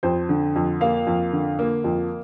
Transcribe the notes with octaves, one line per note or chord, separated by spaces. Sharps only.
F2 C5
D3
F2
A#3 F5
F2
D3
A#3
F2